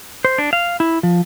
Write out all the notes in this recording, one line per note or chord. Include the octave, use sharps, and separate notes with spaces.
C5
D4
F5
E4
F3